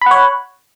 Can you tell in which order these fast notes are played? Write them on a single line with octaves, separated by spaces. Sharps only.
B5 F#5 C#5